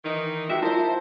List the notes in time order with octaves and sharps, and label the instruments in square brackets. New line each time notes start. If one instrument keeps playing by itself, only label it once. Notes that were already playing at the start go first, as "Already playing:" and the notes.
[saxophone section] D#3 E3 D#4
[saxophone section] G#3 E5 [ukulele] D#4 F#4 G4
[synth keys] E4 F4 A5 [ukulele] A#4 E5 [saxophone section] C5